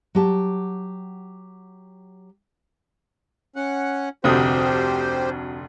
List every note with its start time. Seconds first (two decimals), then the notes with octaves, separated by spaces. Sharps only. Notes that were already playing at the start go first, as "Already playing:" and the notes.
0.15 F#3 G4 A5
3.56 C#4 F#5
4.24 F1 D2 C4 F#4 G4 C5 D#6